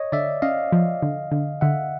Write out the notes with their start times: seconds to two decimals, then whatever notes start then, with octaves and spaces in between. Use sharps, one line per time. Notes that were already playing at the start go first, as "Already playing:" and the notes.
Already playing: C#5 D#5
0.12 D3 D5 E5
0.42 C#4 D#5 F5
0.72 F3
1.02 D3
1.32 D3
1.61 D3 E5 F#5